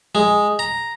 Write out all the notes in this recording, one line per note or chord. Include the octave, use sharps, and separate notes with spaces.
G#3
A#5